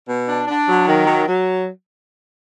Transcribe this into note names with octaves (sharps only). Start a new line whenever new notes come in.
B2
D4
D4
F#3
D#3
F#3
F#3